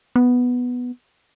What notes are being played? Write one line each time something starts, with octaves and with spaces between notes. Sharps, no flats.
B3